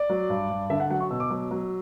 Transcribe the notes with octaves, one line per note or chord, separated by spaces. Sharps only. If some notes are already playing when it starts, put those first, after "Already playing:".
Already playing: D5
F#3
G2
G2
D3 E5
F#5
F#3 F#5
C#6
B2 E6
D6
F#3
F#3